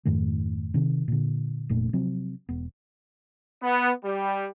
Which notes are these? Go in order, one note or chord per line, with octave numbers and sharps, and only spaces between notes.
F2 G#2 D#3 A3
C3 D#3
A#2 D3
F1 A#2 A3 D4
C3 F3 F#3 C4
E1 B3
B3
G3